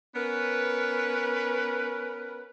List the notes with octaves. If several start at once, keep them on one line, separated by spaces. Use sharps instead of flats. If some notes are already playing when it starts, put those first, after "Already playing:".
B3 C#4 A#4 B4